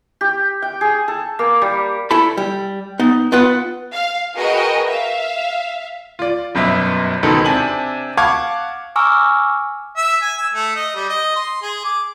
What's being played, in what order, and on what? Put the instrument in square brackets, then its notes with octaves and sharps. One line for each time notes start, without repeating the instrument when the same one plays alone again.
[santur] G4
G5
G#4
A4
A#3
G3
[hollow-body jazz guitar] E4 A4 A5 B5
G3
B3 D#4
B3 F4 B4 F#5
[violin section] F5
F#4 G#4 A#4 B4 D#5 G5
E5 F5
[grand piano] F4 D5
G1 F#2 B2 E5
C#2 G#2 B2 D#3 A4
C3 C4 D4 G#5 A5 F#7
F5 F#5 A5 C#6 D6 G#6
[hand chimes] G#5 A#5 C#6 D6 E6 F6
[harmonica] E5
G#5
E6
A3
D#5
G3
D#5
C6
G#4
D6